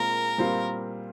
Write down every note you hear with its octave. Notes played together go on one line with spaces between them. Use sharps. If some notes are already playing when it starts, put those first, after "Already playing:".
Already playing: A#2 G#3 C4 F4 G#4 A#4
A#2 G3 C4 F4